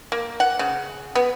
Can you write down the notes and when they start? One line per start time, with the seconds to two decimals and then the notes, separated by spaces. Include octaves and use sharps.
0.12 A#3
0.40 F#5
0.59 C#3
1.15 B3